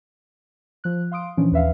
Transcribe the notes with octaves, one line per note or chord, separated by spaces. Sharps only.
F3 F#6
F5 C6 D#6 D7
A#2 E3 F3 C#4 D4
D#2 B4 E5 F5